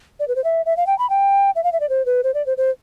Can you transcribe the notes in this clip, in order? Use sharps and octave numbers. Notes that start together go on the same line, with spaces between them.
D5
B4
C5
E5
E5
F5
G5
B5
G5
E5
F5
E5
D5
C5
B4
C5
D5
C5
C5